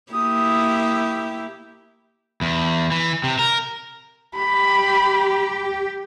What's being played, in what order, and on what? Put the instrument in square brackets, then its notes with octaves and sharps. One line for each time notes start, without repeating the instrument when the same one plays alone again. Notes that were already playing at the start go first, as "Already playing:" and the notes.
[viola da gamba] A#3 E4 G4 [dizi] D#6
[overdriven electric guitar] E2
E3
C3
A#4
[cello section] G4 [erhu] B5